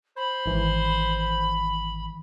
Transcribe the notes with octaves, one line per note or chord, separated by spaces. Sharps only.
C5 B5
G#1 G#2 D#3 E3